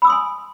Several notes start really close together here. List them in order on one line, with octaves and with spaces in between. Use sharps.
B5 E6 D#6 C6 G#5